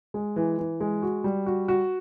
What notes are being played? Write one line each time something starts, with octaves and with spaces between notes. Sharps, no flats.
G#3
E3
E3
G#3
F#4
G3
F#4
F#4